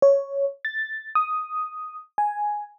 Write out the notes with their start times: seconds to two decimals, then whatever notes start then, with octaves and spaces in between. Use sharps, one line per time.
0.02 C#5
0.65 A6
1.15 D#6
2.18 G#5